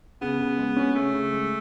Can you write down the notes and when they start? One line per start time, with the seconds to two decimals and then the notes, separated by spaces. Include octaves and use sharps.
0.21 C#3 B3
0.40 C#3
0.58 G#3
0.77 C#4
0.95 C#3 A3
1.14 C#3
1.32 G#3